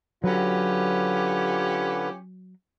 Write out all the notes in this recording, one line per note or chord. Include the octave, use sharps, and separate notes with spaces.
D3 F#3 C#4 F4 G4 B4